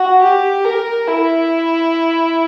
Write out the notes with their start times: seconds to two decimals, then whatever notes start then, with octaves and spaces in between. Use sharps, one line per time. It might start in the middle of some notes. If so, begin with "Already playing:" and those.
Already playing: F#4
0.22 G4
0.64 A#4
1.07 E4